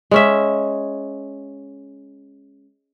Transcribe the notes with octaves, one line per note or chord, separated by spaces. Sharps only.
G#3 C#4 E5